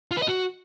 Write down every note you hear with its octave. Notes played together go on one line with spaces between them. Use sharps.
F4
B4
D#5
F#4